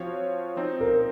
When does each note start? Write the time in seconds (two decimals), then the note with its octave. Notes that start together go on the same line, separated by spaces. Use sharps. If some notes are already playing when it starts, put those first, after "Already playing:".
Already playing: F3 C4 F#4 C#5 F5
0.57 F3 C4 D#4
0.81 A#4